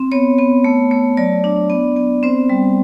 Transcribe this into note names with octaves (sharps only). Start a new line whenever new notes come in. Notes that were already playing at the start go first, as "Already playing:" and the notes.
Already playing: C4
B3 C#5
B3
A3
A3
F#3 D5
D4
B3
B3
C4 C5
G3